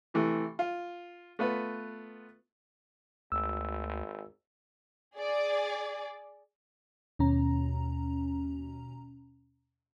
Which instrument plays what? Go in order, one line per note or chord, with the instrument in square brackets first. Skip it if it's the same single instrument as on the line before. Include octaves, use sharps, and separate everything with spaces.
[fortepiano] C3 E3 A3
F4
A3 B3 F4 B4
[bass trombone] G#1 [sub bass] D2 [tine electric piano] E6
[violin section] G#4 D5
[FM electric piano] D#2 B2 C#4 A#5